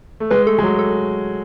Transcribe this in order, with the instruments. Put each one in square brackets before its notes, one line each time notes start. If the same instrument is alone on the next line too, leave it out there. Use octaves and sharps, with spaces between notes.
[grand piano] A3
[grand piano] G#3 [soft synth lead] B4
[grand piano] A3 [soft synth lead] A4
[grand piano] G#3
F#3
[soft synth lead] A4